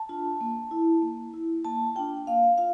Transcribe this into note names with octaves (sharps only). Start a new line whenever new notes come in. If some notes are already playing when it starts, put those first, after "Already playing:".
Already playing: A5
D4 F4
A#3
E4
A#3
E4
A#3 A5
D4 F4 G5
A#3 F5
F4 F5